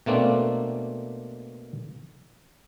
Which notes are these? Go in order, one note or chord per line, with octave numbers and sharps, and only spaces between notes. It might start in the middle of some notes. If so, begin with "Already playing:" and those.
B2 A3 A#3 C4 D4